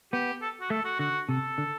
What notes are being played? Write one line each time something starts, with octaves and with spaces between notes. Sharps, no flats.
B3 G4
A4
F#4
A3 A4
F#4
D3 F#4
C3 A4
D3